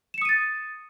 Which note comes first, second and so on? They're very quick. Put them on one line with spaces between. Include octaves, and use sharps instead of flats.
E7 C#7 D#6 D#7 A6